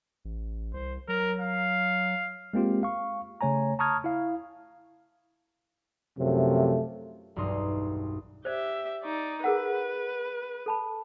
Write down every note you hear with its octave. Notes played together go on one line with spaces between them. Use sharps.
A1
C2 C5
F#3 A#4
F5
G#3 A#3 C4 F4 G4
F5 C#6
C#3 A3 C#5 G#5 A#5
A5 A#5 C#6 D#6 F6 G#6
E4 F5
F#2 C3 F3 A3
E1 B1 G2 D#4 C6 D#6
G4 C5 D5 E5
D#4 D5 C#6
G#4 A#4 B4 F#5
A4 A5 B5